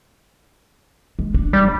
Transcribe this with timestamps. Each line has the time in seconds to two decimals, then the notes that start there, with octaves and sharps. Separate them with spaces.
1.19 G#3
1.34 D4
1.53 G3
1.65 F3